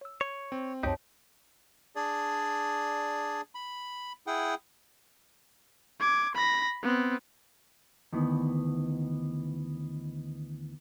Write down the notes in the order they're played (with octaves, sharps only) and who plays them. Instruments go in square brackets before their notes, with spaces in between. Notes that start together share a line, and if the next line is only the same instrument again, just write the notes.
[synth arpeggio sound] C#5 E6
[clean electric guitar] C#5 [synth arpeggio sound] G#6
[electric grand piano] C4
[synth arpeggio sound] C#2 F#2 [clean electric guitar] D#4 G4 [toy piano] F#4 C#5 A5
[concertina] D4 G#4 D5
B5
E4 G#4 F#5 G5
[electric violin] D6 G#6
B5 A#6
B3 C4
[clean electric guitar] D2 D#3 E3 B3